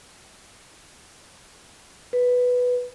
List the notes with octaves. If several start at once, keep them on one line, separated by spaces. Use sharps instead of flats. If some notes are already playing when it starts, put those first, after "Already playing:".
B4